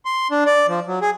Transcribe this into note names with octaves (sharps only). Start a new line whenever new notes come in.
C6
D4
D5
F3
F#3
G#4